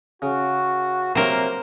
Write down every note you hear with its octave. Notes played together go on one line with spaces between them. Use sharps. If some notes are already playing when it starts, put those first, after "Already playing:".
C#3 F#4
C3 F#3 A#3 A#4 C5